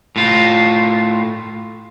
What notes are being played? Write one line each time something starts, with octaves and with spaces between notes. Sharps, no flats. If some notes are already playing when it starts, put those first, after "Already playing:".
A2 F4